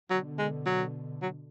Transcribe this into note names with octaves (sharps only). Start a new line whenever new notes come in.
B2 D3 F#3
G#3
F#3
F#3